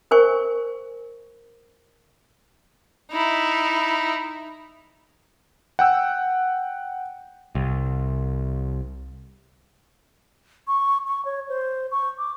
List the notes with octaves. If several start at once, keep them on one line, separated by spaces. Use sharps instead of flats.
A#4 C5 G#5 C#6
D#4 E4
F#5 G5 E6
C2
C#6
C#6
C#5
C5
C#6
D6